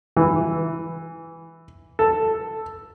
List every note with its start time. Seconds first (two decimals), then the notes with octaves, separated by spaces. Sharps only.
0.17 E3
1.99 A4